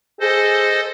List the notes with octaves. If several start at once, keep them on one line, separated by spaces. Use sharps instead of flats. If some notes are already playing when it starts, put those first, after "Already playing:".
G#4 A4 C5 D#5